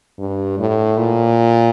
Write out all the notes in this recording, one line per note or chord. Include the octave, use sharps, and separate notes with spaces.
G2
A2
A#2